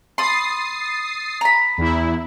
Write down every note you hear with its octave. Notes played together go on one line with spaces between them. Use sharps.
B5 C6 D#6 A6 C7
A#5 B5
E2 E4